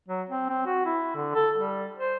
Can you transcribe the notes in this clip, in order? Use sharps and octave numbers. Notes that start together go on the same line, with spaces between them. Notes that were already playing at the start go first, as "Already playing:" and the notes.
F#3
C4
C4
F#4
E4
D3
A4
G3
C5